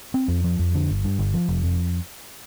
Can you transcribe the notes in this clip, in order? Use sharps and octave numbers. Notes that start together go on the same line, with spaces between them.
C4
F2
F3
F2
D3
G1
G2
G1
F3
F1
F2